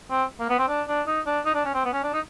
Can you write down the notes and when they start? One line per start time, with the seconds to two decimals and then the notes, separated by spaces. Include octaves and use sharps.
0.10 C4
0.40 A#3
0.49 B3
0.58 C4
0.68 D4
0.88 D4
1.07 D#4
1.26 D4
1.45 D#4
1.54 D4
1.65 C#4
1.74 C4
1.84 B3
1.93 C#4
2.03 D4
2.13 D#4